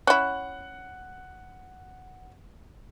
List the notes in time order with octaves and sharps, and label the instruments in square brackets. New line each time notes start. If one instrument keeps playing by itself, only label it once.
[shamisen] C#4 E4 [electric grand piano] F#5 F#6